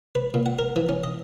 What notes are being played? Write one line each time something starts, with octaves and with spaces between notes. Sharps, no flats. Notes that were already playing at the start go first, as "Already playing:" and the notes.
B4
A#2
F#5
A#4
E3
C#4
D#5